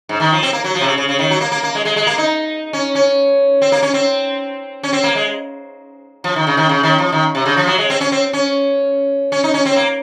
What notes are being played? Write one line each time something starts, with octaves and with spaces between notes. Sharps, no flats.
G#2
D#3
F3
C4
A#3
F#3
F3
C3
C#3
C#3
C#3
D#3
F#3
A#3
A#3
A#3
G#3
G#3
G#3
A#3
D#4
C#4
C#4
C4
A#3
C#4
C4
C#4
C4
A#3
G#3
F3
D#3
C#3
D#3
C#3
D#3
F3
D#3
C3
C#3
F3
F#3
G#3
C4
C#4
C4
C#4
C#4
D#4
C#4
C4
A#3